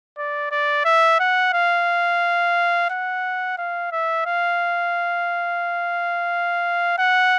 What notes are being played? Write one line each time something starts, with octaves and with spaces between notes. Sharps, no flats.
D5
D5
E5
F#5
F5
F#5
F5
E5
F5
F#5